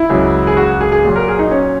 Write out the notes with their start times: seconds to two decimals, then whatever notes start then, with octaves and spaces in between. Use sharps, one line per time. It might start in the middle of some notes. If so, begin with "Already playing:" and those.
Already playing: E4
0.09 C#2 C#3 F#3
0.47 G#4
0.57 F#4
0.81 G#4
0.92 G#4
1.04 A#2 F#3
1.16 A#4
1.28 G#4
1.39 D#4
1.51 C#4